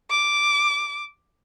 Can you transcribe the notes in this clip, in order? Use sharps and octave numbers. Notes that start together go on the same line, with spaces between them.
D6